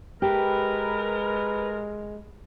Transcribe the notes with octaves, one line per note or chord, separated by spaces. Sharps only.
G#3 G4 A#4 B4